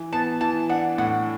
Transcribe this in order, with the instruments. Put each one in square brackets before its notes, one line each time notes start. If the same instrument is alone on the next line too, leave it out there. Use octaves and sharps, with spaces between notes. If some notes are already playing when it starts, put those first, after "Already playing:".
Already playing: [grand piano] E3
[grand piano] B3 [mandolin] A5
[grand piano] E3 [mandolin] A5
[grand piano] D4 [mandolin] F#5
[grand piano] A2 [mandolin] F#5